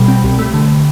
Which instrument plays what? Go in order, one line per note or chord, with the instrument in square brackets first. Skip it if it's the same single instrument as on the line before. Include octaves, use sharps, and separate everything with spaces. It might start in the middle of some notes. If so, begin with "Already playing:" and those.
Already playing: [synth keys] B2 G3 G5 B5
C4
C2
A3
D3